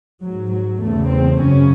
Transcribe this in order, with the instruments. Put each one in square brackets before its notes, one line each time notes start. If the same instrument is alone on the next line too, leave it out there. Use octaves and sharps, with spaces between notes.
[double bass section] G#2 F#3
F#3
E2 C#3 A3
C4
F#2 C#3 C#4